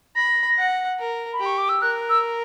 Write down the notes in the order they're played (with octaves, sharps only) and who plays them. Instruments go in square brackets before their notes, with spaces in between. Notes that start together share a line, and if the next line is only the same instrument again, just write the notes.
[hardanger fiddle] B5 [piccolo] A#6
[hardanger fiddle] F#5
A#4
[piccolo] B5
[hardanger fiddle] G4
[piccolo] C#6
D6
E6
[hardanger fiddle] A#4 [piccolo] F#6
[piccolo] E6